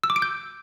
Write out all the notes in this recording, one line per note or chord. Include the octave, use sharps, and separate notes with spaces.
E6
D6
D7
G6